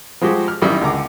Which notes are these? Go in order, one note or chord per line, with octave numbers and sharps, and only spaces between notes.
F3 G#3 F#4 G4
F6
A1 F#2 D#3 G3 E4 B5
C#2 D3 A#4 A#5 D6